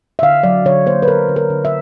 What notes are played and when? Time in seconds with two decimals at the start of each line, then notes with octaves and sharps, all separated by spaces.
0.19 E5
0.22 D3 F5
0.43 F#3 D5
0.65 D3 C#5
0.86 A#3 C5
1.03 B4
1.08 D3 A#4
1.29 D3
1.36 A#4
1.50 D3
1.65 E5